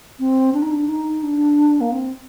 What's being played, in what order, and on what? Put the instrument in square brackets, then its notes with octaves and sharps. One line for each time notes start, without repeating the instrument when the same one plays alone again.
[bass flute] C4
D4
D#4
D4
D#4
D4
A#3
C4